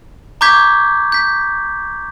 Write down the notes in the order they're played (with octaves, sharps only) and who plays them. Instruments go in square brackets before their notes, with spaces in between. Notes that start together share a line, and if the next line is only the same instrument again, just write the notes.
[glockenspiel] A#5 C#6 D6 G6 G#6 B6
G6 B6